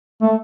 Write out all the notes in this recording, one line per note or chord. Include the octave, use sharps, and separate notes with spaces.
A3